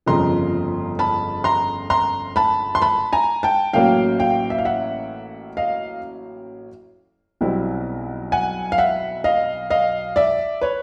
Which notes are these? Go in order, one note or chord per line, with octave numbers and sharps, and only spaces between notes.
G1 F2 C#3 F3 A#5 C6
A5 B5
A#5 C6
A#5 C6
A5 B5
C6
A5 B5
G#5 A#5
G5 A5
A1 A2 F#3 A#3 C#4 F5 G5
F5 G5
E5
F5
E5 F#5
D#5 F5
B1 B2 G3 C4 E4
F#5 G#5
F5
E5 F#5
D#5 F5
D#5 F5
D5 E5
B4 C#5